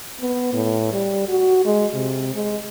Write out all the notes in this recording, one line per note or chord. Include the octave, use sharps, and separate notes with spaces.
B3
A2
G3
F#4
G#3
C3
G#3